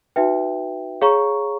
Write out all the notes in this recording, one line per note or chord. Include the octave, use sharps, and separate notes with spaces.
D#4 F#4 B4 E5 G5
G#4 C#5 F5 A#5 C#6